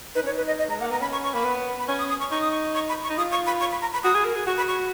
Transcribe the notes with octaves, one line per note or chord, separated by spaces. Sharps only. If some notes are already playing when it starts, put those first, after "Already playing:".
D#4 B4
C#4
C#5
D#4
B4
D#5
D#5
G#3 A#5
A#3 F#5
B3 A#5
C#4 B5
C#6
C#6
A#3 B5
B3
B5
C#4 C#6
D#6
D#6
C#6
D#4 C#6
D#6
C#6
C#6
B5
C#6
D#4
F4 D#6
C#6
B5
C#6
B5
A#5
B5
F#4 D#6
G#4
A#4
G#4
F#4 C#6
B5
C#6